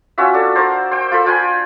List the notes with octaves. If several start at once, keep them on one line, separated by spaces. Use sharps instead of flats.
C#4 F4 F#4 E5
D4 A4
D4 A#4 C5
C5 G5
F4 A4 B5
F4 G5 G#5 B5